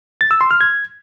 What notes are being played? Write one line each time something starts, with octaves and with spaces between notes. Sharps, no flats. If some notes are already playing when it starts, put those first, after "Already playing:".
A6
E6
C6
F6
G#6